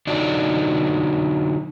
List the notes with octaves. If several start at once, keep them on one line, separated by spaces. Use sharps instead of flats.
D3 F#3 D#4 D5